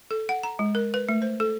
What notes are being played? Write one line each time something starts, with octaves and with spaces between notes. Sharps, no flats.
A4
F#5
A#5
G#3
A#4
B4
A3
C5
A4